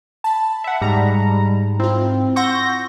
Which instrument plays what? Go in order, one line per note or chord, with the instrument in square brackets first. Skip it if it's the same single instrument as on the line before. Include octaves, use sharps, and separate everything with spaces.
[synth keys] A5 B5
[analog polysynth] E5 F#5
[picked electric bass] G#2 G#3 [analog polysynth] G3 A#5
[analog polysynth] C4 [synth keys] E4 F4
[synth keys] F#5 C6 E6 [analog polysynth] C#6 G6 A#6